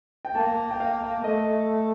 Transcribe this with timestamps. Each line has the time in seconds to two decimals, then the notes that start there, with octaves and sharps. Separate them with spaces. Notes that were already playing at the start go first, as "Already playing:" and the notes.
0.25 G5
0.35 A#3 A5
0.71 G5
0.80 F5
1.24 A3 D#5